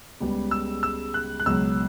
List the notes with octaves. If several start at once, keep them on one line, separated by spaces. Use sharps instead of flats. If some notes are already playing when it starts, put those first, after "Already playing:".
C#2 C#3 G3 B3
E6
E6
F#6
F#6
C#2 B2 F#3 E6